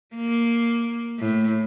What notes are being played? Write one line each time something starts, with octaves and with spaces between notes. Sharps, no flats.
A#3
A2